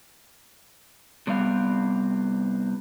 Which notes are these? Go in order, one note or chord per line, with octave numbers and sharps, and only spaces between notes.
C3 G3 B3 F5